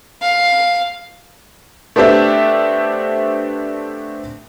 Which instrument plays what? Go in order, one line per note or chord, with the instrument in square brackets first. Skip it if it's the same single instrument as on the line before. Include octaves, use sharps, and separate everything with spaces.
[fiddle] F5
[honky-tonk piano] A3 B3 C4 D4 G4 E5